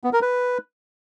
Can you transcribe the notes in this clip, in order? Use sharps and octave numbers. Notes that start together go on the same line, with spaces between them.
B3
A#4
B4